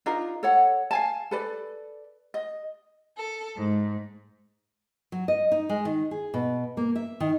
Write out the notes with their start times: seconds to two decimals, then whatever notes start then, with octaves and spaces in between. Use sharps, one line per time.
0.06 D4 D#4 F4 A#4
0.43 A4 C#5 F#5
0.91 F5 G#5 A5
1.31 A4 B4 D5
2.34 D#5
3.17 A4
3.56 G#2
5.12 F#3
5.28 D#5
5.52 D#4
5.69 G#3
5.85 D#3
6.11 G#4
6.34 B2
6.77 A#3
6.96 E5
7.20 D#3